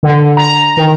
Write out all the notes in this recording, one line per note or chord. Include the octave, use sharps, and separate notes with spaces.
D3
A#5
D#3